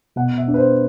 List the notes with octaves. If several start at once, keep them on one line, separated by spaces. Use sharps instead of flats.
B2 F#5
E5
D4
B4
C5